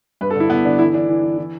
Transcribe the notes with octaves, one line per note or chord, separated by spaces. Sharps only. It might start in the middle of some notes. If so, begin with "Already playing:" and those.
G2 B4
A4
D3
E4
D3 B3
D3 D4
E3 E4
E3 D4
E3
E3
E3